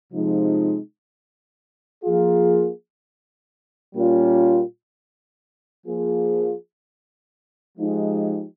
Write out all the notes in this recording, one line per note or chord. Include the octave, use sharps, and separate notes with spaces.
C3 F3 G#3 D#4
F3 A#3 F4 G#4
A#2 G3 A#3 C#4 F4
F3 A#3 F4 G#4
F3 G#3 D#4 G4